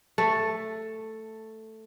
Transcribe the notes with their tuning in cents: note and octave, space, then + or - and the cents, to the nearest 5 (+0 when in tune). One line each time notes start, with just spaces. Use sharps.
A3 +5